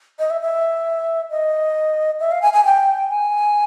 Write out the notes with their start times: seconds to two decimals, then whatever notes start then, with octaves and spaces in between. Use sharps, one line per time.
0.19 D#5
0.30 E5
0.41 E5
1.30 D#5
2.20 E5
2.31 F5
2.42 G#5
2.53 G#5
2.65 G5
3.09 G#5